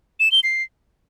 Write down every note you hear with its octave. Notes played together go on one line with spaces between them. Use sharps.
E7
G7
C7